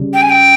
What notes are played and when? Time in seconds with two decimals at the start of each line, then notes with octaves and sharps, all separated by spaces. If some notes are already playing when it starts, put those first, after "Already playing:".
Already playing: C#3 G3 C#4
0.14 G5
0.21 G#5
0.29 G5